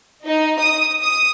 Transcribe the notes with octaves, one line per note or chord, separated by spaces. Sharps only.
D#4
D#6
D#6